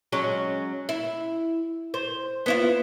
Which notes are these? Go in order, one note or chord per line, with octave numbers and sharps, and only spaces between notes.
F#3 G#3 C#4
E4
C5
B3 E4 F4